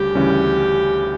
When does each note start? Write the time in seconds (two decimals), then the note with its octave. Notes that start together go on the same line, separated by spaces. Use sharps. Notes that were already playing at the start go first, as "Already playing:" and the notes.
Already playing: D2 C#3 G3 G4
0.15 D2 C#3 E3 G3 C#4